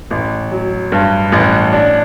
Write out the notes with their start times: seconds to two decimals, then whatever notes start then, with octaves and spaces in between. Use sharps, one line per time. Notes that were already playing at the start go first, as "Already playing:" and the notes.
0.11 A1
0.51 F#3
0.92 G2
1.32 A1
1.72 D4